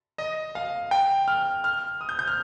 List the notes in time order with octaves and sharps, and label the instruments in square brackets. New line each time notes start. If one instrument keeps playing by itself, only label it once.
[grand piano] D#5
F5
G5
F6
F6
D#6
G6
G6
F6